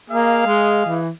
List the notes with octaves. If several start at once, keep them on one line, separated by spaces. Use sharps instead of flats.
A#3 G#4 D#5 F5
G#3
E3